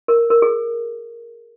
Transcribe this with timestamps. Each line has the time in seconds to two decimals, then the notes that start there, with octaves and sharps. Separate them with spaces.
0.08 A#4
0.30 A#4
0.42 G#4